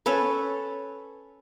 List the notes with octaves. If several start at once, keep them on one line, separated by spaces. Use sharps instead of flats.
C#4 A4 B4